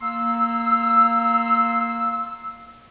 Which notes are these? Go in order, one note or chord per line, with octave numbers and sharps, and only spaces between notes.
A#3 F5 C6 E6